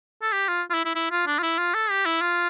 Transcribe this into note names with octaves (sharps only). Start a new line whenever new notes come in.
A4
G4
F4
F4
E4
E4
E4
F4
D4
F4
E4
F4
A4
G4
E4
F4